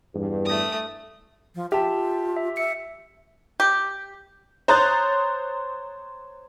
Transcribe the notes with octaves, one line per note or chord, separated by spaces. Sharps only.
E2 G2
A3 D#6
F3
F4 G4 E5 A5
E5
E5 C#7
G4
C5 C#5 A#5 D#6 F#6 A6